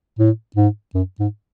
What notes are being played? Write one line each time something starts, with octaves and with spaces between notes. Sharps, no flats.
A2
G#2
F#2
G#2